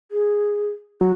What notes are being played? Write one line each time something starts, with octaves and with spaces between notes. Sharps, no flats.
G#4
F#3 F#4